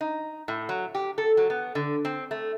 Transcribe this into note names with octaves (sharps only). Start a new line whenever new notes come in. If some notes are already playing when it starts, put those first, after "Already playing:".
D#4
A2
F#3
G4
A4
F#3
B3
D3
C4
A3